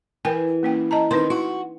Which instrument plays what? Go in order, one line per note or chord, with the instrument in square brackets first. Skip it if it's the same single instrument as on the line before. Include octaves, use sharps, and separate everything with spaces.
[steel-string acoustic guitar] E3 [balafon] A#4 G5 G#5
[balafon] A#3 C#4 G5
D#5 A5 A#5
[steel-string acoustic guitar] D#3 C4 [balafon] D#4 B4 C6
[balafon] E4 [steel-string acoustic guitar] F#4